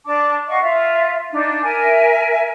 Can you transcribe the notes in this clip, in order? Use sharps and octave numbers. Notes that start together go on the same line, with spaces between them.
D4 A5 D6
D#5 F5 F#5 C#6
F4 E5
D4 D#4
A#4 E5 G#5